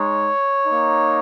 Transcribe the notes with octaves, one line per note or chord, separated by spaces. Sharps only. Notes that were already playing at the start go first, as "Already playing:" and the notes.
Already playing: G#3 D#4 C#5
A#3 D#4